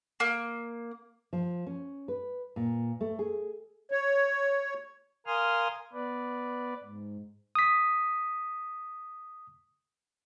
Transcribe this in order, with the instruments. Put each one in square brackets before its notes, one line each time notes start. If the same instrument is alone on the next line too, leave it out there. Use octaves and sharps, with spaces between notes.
[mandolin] A#3
[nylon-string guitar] F3
C#4
B4
A#2
A3
G#4
[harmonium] C#5
[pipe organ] A#4 F5 G#5 C6 D#6 F6
B3 B4 D5
G#2
[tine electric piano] D#6 B6